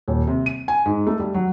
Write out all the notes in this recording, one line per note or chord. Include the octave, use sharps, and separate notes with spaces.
D#1
C3
D#7
G#5
G#2
A3
G3
F#3